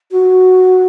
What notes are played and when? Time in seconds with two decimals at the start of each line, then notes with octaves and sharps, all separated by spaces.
0.11 F#4